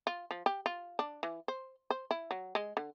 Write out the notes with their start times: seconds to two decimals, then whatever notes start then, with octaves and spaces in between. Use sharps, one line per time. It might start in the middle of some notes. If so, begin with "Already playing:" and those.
0.07 F4
0.31 F3
0.46 G4
0.66 F4
0.99 D4
1.23 E3
1.48 C5
1.90 C5
2.11 E4
2.31 F#3
2.55 G#3
2.77 D3